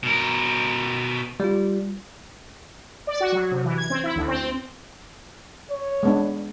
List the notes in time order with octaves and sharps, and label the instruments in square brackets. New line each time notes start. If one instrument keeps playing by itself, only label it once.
[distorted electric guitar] B2 A#4
[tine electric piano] G3 F4
[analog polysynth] D5
F#4
F#3
C3
E3
G#6
C4
E4
D2
C4
[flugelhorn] C#5
[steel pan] G#3 B3 D4